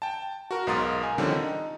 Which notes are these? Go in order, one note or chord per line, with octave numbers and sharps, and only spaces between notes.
G5 A5
F#4 A#4
B1 G#2 A#4 C6 D#6 A6
A#4 G#5
D3 D#3 F3 G3 C4 C#4
D#4